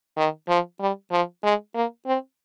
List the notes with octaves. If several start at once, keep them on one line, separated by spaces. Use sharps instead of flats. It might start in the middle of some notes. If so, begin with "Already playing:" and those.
D#3
F3
G3
F3
G#3
A#3
C4